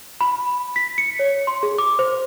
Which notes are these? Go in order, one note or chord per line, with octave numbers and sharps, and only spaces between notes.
B5
B6
C#7
C#5
C6
G#4
D6
C5